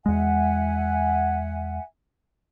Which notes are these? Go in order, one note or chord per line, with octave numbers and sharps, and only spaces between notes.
E2 G#3 E5 F#5 G#5